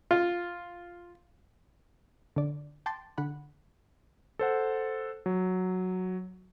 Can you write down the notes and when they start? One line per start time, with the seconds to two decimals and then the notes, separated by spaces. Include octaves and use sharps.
0.11 F4
2.36 D3 D5
2.86 G5 A5 C6 D6 A6
3.18 D3 F#5 B5
4.39 A4 C5 F#5
5.26 F#3